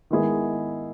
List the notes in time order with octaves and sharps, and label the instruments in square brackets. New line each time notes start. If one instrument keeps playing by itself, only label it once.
[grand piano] D#3 G#3 B3 E4 G#4